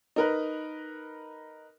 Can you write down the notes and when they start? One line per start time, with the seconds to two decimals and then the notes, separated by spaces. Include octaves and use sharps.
0.16 D#4 A#4 B4